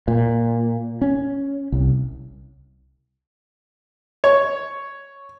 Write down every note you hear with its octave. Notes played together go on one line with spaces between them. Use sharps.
A#2
C#4
C2
C#5